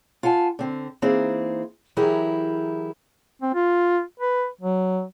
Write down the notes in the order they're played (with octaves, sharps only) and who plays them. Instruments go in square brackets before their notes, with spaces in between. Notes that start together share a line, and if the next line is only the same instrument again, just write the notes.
[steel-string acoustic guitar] F4 F#5 G#5 A5
D3 C4
E3 A#3 C4 D#4 G#4
E3 F#3 E4 G4 G#4 A#4
[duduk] C4
F4
B4
F#3